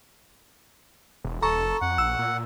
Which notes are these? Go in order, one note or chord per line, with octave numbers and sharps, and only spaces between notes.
E1
D#1 A4 A#5 C#6
F1
F2 F#5
A#1 E6
A#2